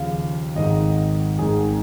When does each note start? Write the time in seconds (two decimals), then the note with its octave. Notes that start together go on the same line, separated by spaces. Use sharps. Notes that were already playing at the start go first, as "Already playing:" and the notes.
Already playing: D#2 C#3 F3 F5
0.55 G#1 G#2 D#3 D#5
1.39 G#1 G#2 D#3 G#4